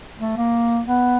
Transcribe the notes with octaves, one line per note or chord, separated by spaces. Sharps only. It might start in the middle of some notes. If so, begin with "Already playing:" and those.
A3
A#3
B3